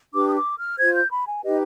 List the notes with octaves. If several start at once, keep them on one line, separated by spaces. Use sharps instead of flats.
D4 G4 B4 D6
D#6
D6
F6
F4 C5 G#6
G6
B5
G#5
D#4 G4 B4 D#5